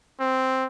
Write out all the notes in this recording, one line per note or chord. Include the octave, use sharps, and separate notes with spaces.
C4